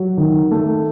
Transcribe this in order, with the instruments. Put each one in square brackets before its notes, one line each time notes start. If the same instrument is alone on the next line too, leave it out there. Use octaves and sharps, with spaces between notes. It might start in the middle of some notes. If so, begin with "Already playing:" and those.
Already playing: [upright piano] F#3
D#3
A3